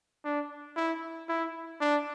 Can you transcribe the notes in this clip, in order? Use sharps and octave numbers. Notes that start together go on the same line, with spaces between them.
D4
E4
E4
D4